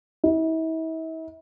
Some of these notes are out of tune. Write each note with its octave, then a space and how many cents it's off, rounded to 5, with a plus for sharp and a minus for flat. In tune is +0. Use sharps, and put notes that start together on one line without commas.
E4 -40